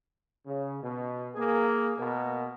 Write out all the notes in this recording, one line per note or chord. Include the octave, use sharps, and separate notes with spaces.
C#3
B2
A#3 G#4
B2 A#3